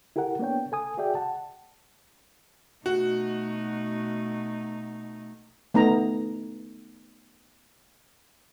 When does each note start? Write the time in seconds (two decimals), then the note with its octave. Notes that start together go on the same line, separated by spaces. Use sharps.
0.16 E4 G4 A4 A#4 F#5
0.39 A#3 B3 D4 C#5 G5
0.72 A4 G#5 D#6
0.98 F#4 G#4 D5 E5 G5
1.15 F#5 A5
2.86 B2 A3 D#4 F#4
5.74 A3 B3 D#4 A#5